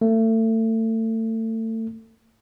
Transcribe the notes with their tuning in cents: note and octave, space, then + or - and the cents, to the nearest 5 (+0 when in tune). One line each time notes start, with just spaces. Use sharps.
A3 +30